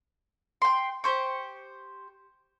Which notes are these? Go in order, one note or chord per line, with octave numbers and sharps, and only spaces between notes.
G5 C6
G4 C5 C#6